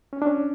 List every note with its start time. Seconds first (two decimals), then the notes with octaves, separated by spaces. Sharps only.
0.13 C#4
0.22 D4
0.27 C#4